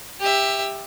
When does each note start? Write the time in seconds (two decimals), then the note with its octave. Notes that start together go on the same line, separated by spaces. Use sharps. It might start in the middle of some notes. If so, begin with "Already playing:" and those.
0.20 G4 E5